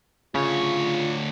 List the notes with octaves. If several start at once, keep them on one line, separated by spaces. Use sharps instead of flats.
D2 C#3 F4 C#5